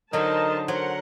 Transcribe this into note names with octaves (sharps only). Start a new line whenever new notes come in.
D3 F#3 D#4 A#4 C5 D#5 A5
F#3 A#4 C5 F#5